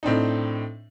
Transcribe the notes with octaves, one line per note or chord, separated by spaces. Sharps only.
A2 C4 D4 D#4